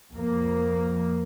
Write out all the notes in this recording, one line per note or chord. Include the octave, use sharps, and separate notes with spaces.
F2 A#3